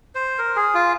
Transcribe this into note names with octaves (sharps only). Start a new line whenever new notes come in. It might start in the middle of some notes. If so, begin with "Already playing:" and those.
C5
A#4
G#4
F4